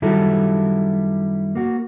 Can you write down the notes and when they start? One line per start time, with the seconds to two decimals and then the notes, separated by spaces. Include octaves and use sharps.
0.02 F#2 D#3 G3 E4 F#4 A4
1.55 A#3 F#4